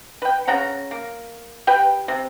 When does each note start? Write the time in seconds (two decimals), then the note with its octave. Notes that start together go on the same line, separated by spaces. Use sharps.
0.22 B4 G5
0.47 C#3 C#5 F#5 A#5
0.91 A#3
1.67 G4 B4 G5
2.08 C3